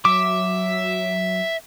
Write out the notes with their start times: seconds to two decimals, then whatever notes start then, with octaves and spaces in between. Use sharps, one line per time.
0.05 F#3 E5 D6